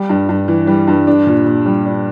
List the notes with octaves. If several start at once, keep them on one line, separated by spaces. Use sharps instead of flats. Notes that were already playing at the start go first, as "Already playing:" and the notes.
Already playing: G3
G2
G2
E3
G3
G2
D4
A#2
A#2
G3
D4